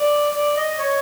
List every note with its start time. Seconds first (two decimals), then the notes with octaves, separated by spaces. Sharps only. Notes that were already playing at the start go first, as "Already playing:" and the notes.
Already playing: D5
0.35 D5
0.57 D#5
0.79 C#5